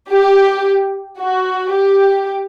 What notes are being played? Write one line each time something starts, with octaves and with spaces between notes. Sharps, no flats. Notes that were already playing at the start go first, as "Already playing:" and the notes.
G4
F#4
G4